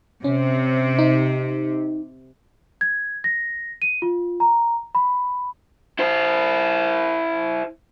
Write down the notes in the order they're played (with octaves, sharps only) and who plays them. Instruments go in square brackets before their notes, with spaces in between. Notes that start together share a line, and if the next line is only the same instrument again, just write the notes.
[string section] C3 [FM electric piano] C#4
[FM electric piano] D#4
[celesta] G#6
A#6
D#7
F4
A#5
B5
[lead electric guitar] E4 C5